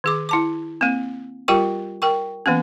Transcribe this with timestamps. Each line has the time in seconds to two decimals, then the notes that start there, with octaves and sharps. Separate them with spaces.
0.04 D#3 G#4 D6
0.29 E4 A5 D6
0.81 A#3 C4
1.48 G3 F4 G4 A#4 G5 C#6
2.02 A#4 G5 C#6
2.46 E3 A#3 B3 C#4